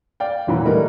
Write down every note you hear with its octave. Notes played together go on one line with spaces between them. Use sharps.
D5 F5 G5
E1 A#2 E3 F#3 B5
G3 A3 E4 A#4 B4 D#5